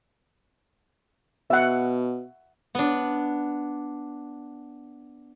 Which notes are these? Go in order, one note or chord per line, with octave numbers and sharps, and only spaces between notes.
B2 E5 F#5
B3 D4